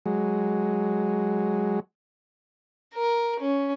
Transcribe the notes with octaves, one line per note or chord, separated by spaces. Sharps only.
F#3 G#3
A#4
C#4